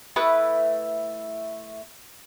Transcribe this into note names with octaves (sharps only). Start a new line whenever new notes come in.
A3 E4 B4 D#6